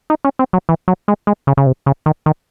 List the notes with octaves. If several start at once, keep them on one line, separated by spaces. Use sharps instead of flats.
D#4
C#4
C4
F#3
E3
F#3
G#3
G#3
C#3
C#3
C3
C#3
D#3
D#3